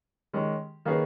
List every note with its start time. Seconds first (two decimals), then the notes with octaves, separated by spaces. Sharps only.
0.33 D#3 G#3 C#4
0.85 D#3 A#3 C#4 G#4 B4